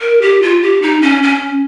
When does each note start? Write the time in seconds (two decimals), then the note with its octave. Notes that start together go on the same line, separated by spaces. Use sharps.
0.01 A#4
0.22 G4
0.42 F4
0.62 G4
0.82 D#4
1.02 C#4
1.23 C#4